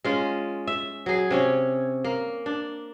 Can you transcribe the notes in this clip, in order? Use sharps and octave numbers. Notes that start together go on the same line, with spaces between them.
G#3 C#4 F4
E5
F#3 G#4
C3 C#4 C#5
A#3
D4